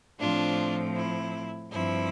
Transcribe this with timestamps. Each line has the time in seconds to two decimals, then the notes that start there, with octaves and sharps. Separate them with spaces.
0.19 A2 F3 C4 D4 F4
0.95 E4
1.71 G2 F3 C4 E4